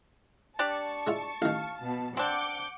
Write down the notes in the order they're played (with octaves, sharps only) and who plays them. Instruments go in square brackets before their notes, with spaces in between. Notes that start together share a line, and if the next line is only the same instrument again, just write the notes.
[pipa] D4 G4 D5 [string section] A5 C#6
[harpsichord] G#3 E4 F4
[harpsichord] A1 D#3 [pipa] F5
[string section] B2 A5
[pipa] C4 D4 [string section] F#5 D6 G6 [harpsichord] B5